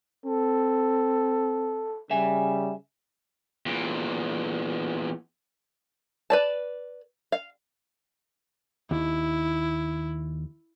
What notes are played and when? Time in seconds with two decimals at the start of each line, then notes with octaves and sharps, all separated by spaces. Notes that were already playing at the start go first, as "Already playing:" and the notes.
0.26 C4 A4
2.11 C#3 G3 E5 G#5
3.66 E2 A#2
6.30 B4 D5 A5
7.32 F5
8.91 D#2 E4